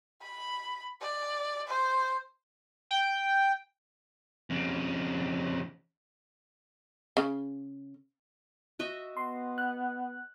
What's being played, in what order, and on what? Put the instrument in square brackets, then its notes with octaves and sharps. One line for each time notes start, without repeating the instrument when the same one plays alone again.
[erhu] B5
D5
C5
[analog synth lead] G5
[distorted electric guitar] F2 C#3
[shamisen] C#3
[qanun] F#4 D#5 E5
[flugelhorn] B3 [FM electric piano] C6
[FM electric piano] F#6